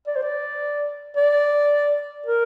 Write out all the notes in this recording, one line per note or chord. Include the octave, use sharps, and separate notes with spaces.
D5
C5
D5
D5
A#4